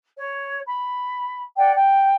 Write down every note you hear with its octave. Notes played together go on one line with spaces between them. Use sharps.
C#5
B5
D5 F#5 G5
G5